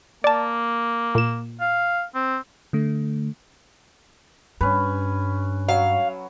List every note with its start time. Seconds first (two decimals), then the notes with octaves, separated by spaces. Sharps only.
0.24 A#3 D5 A5
1.15 A#2 E7
1.61 F5
2.15 C4
2.73 D3 A3
4.61 G2 C#4 B4
5.69 F#3 F5